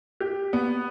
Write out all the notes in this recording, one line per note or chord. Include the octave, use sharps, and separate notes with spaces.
G4
B3